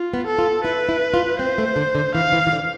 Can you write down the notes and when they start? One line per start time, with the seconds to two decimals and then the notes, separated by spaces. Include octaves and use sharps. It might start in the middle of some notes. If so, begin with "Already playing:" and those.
Already playing: F4
0.14 B3
0.27 A4
0.39 F4
0.64 E4 B4
0.89 E4
1.14 F4
1.39 C4 C5
1.58 A3
1.76 D3
1.95 D3
2.15 E3 F5
2.32 E3
2.47 E3
2.52 D3